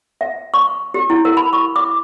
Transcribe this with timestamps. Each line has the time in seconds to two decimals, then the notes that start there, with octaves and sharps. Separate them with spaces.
0.21 E5
0.54 C#6
0.94 G4
1.10 E4
1.25 A#4
1.37 B5
1.53 C#6
1.76 D6